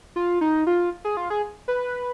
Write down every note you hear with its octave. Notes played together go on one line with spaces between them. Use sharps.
F4
D#4
F4
G#4
F4
G#4
B4